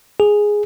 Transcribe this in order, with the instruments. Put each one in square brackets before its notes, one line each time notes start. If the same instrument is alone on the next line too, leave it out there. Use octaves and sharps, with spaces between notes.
[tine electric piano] G#4